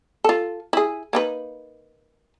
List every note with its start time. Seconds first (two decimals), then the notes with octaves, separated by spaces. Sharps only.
0.24 F4 A4
0.73 E4 G#4
1.13 A#3 D#4 B4